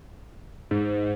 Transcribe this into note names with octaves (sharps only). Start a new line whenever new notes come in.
G#2